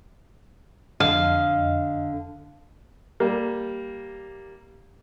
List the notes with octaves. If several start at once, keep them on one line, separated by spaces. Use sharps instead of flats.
F2 D3 D#5 F5
G3 A#3